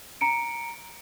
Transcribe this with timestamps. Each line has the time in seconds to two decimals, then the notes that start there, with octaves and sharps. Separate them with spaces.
0.21 A#5 C#7 D7